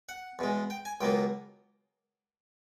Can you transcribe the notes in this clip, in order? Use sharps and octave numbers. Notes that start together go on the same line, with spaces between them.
F#5
E2 B2 G#3
G5
G#5
C#2 B2 F#3 A#3 G5